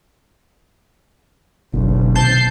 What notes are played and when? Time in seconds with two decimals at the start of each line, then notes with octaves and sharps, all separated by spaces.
1.74 F#1 B1 B2 D3
2.15 C3 D#3 C4 A5 G6 C7